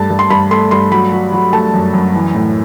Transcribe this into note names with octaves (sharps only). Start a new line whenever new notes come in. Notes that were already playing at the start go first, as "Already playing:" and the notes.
Already playing: G2 A3 A5
G2
C6
G2 B5
A3 C6
G2 C6
F#3 B5
F#3
F#3
A3 A5
F#2
F#2
E3
A2